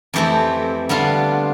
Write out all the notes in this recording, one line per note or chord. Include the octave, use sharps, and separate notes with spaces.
F2 E3 A3 C4 G4
D3 G3 B3 D4 F4